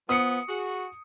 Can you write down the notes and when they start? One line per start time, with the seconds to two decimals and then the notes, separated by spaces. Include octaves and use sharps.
0.09 F3 B3 D#6 C#7
0.49 F#4 G#4